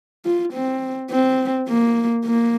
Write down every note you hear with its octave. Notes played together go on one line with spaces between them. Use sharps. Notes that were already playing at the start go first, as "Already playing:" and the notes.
F4
C4
C4
A#3
A#3